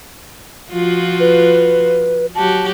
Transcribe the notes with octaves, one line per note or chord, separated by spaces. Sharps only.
F3 F4 F#4
B4
F#3 F#4 G4 A5